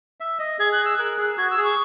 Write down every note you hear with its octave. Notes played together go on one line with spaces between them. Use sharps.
E5
D#5
G#4 G#6
F#6
E6
A#4 F#6
G#4
F#4 G#6
E6
G#4
C#6